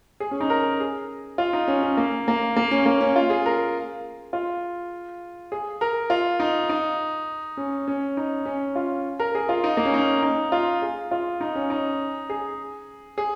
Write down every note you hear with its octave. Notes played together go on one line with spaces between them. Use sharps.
G#4
C#4
D#4
A#4
G#4
F4
D#4
C#4
C#4
A#3
A#3
A#3
C#4
A#3
C#4
F4
G#4
A#4
F4
G#4
A#4
F4
D#4
D#4
C#4
C#4
D#4
C#4
F4
A#4
G#4
F4
D#4
A#3
C#4
D#4
D#4
F4
G#4
F4
D#4
C#4
D#4
G#4
G#4